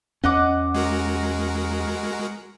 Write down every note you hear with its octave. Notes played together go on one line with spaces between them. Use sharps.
E2 C#4 D#5 F#5 D6
G#3 F#4 A#4